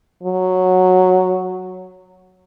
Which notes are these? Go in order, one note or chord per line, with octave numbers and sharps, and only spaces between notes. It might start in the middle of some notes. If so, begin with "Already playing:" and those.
F#3